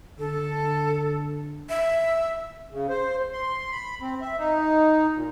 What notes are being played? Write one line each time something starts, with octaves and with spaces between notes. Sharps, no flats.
D3 A4
E5
C#3
C5
C6
B5
C4
E5
D#4
A#2